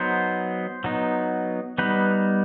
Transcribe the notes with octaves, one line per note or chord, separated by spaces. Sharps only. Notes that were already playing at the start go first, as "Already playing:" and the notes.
Already playing: F#3 B3 D#4 C5
F#3 B3 D#4
G3 B3 D#4 B4